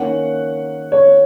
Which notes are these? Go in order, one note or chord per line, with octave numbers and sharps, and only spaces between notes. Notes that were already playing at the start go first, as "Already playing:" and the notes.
Already playing: D#3 A#3 C#4 F#5
C#5